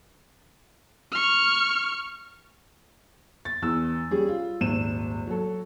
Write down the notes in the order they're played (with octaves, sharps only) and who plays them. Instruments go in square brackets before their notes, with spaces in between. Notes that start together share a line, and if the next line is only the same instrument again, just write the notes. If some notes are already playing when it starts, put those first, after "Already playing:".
[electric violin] C#6 F6
[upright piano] A6
E2 E3 E6
G3 C#4 G#4
F4
D#1 G#1 D#7 E7
F#3 A4